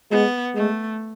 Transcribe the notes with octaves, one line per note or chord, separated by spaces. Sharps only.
G#3 B3
G#3 A3